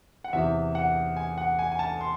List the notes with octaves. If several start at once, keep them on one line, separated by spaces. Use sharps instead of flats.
F#5
E2 C3 E3 E5
F#5
G#5
F#5
G#5
G#5
A5
C6